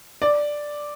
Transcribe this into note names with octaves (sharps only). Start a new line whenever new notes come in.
D5